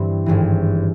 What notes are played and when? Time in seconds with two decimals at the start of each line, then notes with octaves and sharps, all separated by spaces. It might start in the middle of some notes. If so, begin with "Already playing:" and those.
Already playing: G2 E3 G3 C4
0.26 G#1 G2 E3